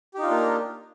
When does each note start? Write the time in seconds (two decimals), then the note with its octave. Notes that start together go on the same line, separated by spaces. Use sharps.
0.14 G4
0.18 D#4
0.23 F4
0.27 D4
0.31 A#3